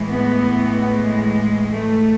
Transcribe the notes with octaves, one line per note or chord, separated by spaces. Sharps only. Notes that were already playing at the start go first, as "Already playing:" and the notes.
Already playing: A2 E3 G#3
B3
G#3
A3